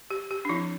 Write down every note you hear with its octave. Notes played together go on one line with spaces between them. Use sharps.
G4
G4
D4
F3 C4 E4